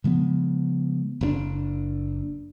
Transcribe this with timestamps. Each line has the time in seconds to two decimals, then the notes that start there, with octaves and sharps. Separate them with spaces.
0.04 C#3 F3 G#3 B3
1.21 F#1 A#2 D4